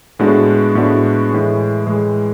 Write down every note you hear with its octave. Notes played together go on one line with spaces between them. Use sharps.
A2 G#3 B3 D4 F#4
A2 G#3 B3 D4 F#4
A2 E3 G#3
A2 E3 G#3